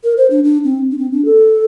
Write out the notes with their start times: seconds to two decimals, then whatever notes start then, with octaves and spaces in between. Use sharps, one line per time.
0.04 A#4
0.17 C5
0.30 D4
0.44 D4
0.64 C4
0.91 D4
0.98 C4
1.12 D4
1.25 A4